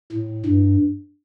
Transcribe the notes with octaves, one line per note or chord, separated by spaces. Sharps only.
A2
G2